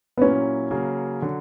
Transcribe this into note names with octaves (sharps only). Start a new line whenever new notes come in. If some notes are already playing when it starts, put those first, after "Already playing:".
B3
A#2 F#3 A#3 C#4 E4
C#3 F#3 A#3
D3 F#3